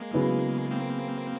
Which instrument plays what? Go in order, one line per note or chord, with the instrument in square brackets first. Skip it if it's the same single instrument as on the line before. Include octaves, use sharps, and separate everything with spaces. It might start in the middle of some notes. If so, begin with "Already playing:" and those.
Already playing: [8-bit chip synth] G#3 A#3
[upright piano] C#3 F#3 B3 E4
[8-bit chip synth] A#3 C4